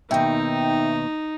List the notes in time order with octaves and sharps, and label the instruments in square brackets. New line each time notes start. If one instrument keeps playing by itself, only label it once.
[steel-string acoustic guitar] D#2 B2 [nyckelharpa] D#4 [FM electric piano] E5 G5